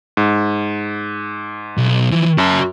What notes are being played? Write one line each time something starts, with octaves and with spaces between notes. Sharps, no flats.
G#2
B1
E3 F3
F#2 F#4 A5